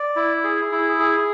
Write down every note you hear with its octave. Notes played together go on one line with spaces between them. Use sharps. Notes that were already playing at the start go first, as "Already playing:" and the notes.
Already playing: D5
E4
G#4
E4
G#4